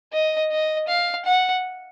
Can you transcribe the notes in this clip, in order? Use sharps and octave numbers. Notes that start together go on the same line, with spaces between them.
D#5
D#5
F5
F#5